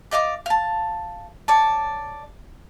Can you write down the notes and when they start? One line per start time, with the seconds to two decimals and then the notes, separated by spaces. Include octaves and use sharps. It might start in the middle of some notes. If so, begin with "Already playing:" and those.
0.11 D5 D#5 F5 D6
0.46 F5 A5
1.48 C#5 D5 A5